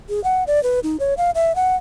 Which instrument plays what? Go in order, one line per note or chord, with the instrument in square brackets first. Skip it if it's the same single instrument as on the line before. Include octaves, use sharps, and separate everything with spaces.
[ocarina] G#4
F#5
D5
B4
D#4
C#5
F5
E5
F#5